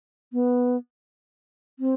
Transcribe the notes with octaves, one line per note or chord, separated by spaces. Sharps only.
B3
C4